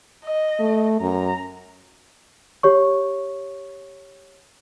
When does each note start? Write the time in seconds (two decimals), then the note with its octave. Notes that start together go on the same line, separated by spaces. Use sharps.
0.24 D#5
0.60 A3
1.01 F#2 A#5
2.63 G4 C#5 C#6